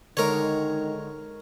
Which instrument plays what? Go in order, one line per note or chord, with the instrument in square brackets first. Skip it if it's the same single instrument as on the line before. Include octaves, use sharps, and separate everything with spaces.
[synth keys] D3 G#3 [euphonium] D#3 [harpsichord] A#4 C#5